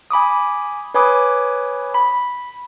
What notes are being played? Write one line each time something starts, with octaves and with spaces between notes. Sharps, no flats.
G#5 B5 D6 D#6
B4 C#5 G#5 B5 D6 D#6
B5